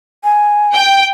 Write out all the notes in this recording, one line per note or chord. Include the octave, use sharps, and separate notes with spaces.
G#5
G5